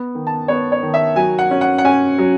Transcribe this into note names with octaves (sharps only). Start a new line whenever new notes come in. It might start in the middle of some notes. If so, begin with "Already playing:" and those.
Already playing: B3
D#3
A5
B3 C#5
C#5
D#3
E5
F#3 G#5
F#5
C#4
F#5
F#5
C#4 G#5
F#3